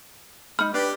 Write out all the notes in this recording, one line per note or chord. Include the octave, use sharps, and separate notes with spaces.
G#3 D#4 B5 F6
D4 G4 B4 D5